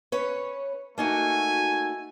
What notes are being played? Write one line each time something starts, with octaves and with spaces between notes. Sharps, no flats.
C#4 B4 C#5
A3 A#3 D#4 F#4 G#5